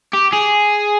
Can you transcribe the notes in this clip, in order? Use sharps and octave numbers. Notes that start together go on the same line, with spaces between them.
G4
G#4